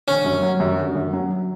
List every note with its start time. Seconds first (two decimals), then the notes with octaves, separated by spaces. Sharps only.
0.07 D3 C#4
0.25 F#2
0.43 F#3
0.60 F#2
0.78 D3
0.95 F#2
1.13 F#3